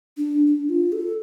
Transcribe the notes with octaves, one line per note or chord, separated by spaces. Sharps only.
D4
D4
F4
A4